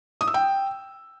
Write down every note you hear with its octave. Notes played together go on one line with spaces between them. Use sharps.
D#6
E6
G5